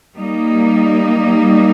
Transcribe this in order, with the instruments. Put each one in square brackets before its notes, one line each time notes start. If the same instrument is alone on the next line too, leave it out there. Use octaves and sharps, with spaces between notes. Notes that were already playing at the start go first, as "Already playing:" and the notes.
[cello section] G3 A#3 D#4